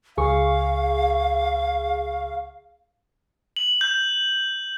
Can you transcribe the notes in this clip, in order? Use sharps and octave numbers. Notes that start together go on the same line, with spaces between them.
C#2 G#4 F5 C#6
F#7
G6